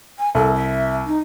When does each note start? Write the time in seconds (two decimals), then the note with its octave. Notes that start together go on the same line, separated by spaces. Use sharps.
0.19 G#5
0.35 C2 A4
0.55 E5
1.07 D#4